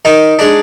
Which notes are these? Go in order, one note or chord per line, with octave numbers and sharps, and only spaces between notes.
D#3 D#4
G#3 D4